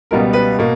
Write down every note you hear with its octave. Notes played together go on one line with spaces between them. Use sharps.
C#2 B2 G3 B3 A#4
B4
B2 A#3